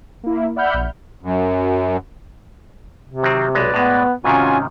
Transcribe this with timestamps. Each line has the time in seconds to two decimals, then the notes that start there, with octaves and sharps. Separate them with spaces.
0.23 A#3 E4
0.56 D5 E5 F#5 B5 F6 G6
0.74 A#1
1.22 F#2
3.09 C3
3.23 D#3 F#3 C4
3.55 B1 G#3 B4 D5
3.74 A2 G#3 B3
4.24 G#2 C3 D#3 C#4 F4 F#4 G#5